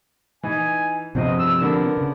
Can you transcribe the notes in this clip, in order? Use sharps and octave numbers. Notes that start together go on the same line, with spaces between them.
E3 D#4 G#5
E2 G2 C3 F3 C4 D#5
E6
D3 B3 D4 A#4
C#3